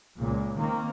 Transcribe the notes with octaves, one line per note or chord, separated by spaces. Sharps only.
C#2 A#2
D#3 A#3 C4